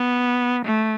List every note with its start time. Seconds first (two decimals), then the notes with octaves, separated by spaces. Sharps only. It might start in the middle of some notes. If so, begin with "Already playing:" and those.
Already playing: B3
0.65 A3